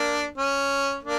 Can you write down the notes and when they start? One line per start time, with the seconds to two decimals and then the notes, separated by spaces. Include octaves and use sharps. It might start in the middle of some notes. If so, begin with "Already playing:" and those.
Already playing: A#3 D4
0.38 C#4
1.03 A#3 D4